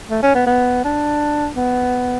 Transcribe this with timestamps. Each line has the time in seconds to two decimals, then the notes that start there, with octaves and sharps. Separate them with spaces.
0.10 A3
0.23 C#4
0.35 B3
0.47 B3
0.84 D4
1.56 B3